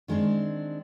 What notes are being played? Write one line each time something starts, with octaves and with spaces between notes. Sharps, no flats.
D#3 G#3 C4 D4